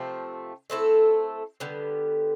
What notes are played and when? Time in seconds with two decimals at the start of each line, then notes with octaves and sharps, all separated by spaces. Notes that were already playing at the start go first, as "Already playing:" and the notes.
Already playing: C3 F3 A3 C4
0.70 A3 C4 E4 A4
1.60 D3 G3 B3